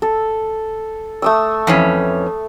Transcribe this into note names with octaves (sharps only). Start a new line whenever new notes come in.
A4
A3 D#6 E6
F2 E3 C#4